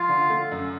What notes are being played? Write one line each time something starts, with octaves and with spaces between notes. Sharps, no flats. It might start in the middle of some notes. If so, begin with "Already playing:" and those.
Already playing: F3 F4
D3
A3
F#2